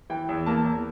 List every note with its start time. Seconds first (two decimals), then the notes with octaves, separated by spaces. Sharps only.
0.10 E3 G5
0.29 E2
0.46 A#3 A5
0.65 E2